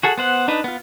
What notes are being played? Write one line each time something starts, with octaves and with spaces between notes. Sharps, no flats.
F#4 G#4 A4 F#5
B3 C5 F#5
D4 D#4 B4
B3 F4